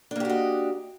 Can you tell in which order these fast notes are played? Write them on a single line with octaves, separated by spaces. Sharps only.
D4 A#3 G4 F#4 D#5